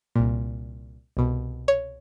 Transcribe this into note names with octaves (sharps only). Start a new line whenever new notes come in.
C2 A#2
C2 B2
C#5